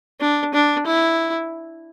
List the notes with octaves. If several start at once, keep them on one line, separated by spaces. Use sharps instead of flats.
D4
D4
E4